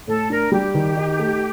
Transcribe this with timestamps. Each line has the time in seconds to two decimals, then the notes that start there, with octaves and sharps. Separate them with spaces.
0.07 A2 A4
0.30 D4 A#4
0.52 G3 G4
0.74 D#3
0.96 D#4
1.19 A3